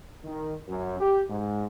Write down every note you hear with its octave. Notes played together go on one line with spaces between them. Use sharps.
D#3
F#2
G4
G#2